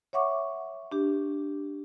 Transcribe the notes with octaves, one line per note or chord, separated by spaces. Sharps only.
C#5 E5 F#5 C#6 D6
D4 G4